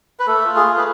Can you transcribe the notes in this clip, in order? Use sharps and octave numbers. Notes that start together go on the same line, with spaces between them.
B4
A3 A4
F4
G#4
A3
B4